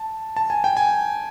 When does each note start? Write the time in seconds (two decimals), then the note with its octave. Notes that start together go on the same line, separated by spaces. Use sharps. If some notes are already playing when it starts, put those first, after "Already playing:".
Already playing: A5
0.37 A5
0.50 G#5
0.64 G5
0.77 G#5